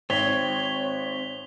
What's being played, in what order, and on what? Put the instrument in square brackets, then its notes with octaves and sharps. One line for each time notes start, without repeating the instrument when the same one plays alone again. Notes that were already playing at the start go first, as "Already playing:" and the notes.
[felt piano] G#1 [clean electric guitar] C4 [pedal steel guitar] C#5 [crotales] B6 F7 G7